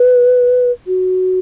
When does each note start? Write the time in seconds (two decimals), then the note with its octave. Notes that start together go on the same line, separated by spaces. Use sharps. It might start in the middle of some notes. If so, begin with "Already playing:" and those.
Already playing: B4
0.87 F#4